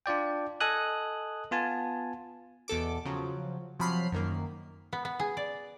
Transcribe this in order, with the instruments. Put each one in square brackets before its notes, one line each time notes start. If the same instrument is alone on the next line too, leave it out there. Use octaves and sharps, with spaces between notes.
[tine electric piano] D4 F4 D5 G5
A4 D#5 G#5 D#6 F#6
B3 F4 G#5 A5
[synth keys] E2 B2 A4 D6
C#3 F3 F#3
C3 F3 F#3 B5 F6 C7
F#2 D#3 A#3
[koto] B3
B3
G#4
D5